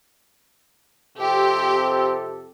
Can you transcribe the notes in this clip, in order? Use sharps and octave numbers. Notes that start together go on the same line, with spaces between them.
F2 C3 C4 G4 A4